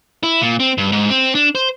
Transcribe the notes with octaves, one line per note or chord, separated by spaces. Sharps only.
E4
A#2
C4
G2
G#2
C4
D4
C5